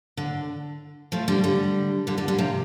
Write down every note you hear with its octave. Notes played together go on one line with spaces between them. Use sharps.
D3
F3 A3
D3 G3
D3 G3
D3 G3
D3 G3
D3 G3
C3 F3